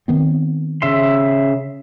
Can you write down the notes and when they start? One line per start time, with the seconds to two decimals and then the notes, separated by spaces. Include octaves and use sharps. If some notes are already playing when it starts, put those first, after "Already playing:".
0.08 D#3 B3 C4
0.82 C#3 E5 C6